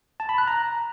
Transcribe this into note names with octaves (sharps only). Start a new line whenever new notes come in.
A5
B5
F#6
A#5